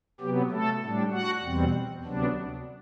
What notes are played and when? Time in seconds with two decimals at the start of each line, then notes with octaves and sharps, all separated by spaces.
0.20 C3 F#3 B3 G4
0.51 A3 A4
0.81 A2 G3 D4
1.12 F#4 F#5
1.42 E2 B2 G3 C4
2.04 D2 C3 F#3 B3 D4